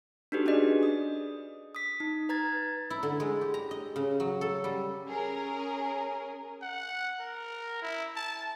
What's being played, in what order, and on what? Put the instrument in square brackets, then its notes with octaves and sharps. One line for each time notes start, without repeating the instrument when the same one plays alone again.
[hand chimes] D4 D#4 F#4 G4 A4 B4
C#4 D4 F#4 G#4 D5 D#5
D#6
D#6 B6
D#4
B4 A#5 G#6 A6
[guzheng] E4
D3
G#3
G4
A#5
D#5
C#3
F#3
A4
G3
[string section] C#4 G#4 A#4
[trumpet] F#5
A#4
E4
A5